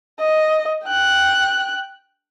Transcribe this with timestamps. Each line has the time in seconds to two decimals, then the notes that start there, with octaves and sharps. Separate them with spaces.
0.19 D#5
0.85 G5 F#6